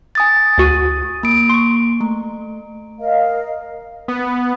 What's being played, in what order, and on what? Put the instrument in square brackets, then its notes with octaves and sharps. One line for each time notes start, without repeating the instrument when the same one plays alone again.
[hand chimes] G#5 D#6 A6
[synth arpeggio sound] D2 F#4 D#7
[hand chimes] A#3 D7
[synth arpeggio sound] C6 C#6
[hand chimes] A3
[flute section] A#4 D#5 F5
[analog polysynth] B3